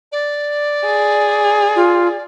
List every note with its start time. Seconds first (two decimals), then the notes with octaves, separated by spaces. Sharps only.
0.12 D5
0.86 G#4
1.76 F4